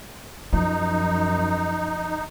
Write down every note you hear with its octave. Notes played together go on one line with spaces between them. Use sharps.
F#2 F3 D#4